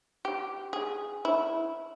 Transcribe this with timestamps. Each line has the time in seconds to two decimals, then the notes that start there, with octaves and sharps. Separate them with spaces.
0.25 G4
0.73 G#4
1.25 E4